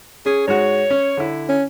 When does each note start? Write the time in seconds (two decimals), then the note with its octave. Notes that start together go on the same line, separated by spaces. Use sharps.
0.26 C#4 G#4
0.48 G#2 G#3 F#4 C#5
0.90 C#4
1.17 D3 E4
1.49 C#4